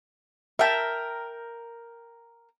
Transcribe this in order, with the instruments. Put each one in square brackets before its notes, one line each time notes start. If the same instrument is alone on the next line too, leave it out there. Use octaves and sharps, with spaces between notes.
[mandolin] A#4 G5 [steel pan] E5 A5